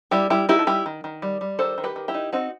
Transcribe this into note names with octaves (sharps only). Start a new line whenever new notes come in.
G3 E4 G4
G3 E4 G4
D#4 E4 G4
A4
G3 E4 G4
D#3
D#3
G3
G3
D#3 A4 C5
D#3
G4 B4
D#3
E4 G4
D#4
C4 D#4 F#4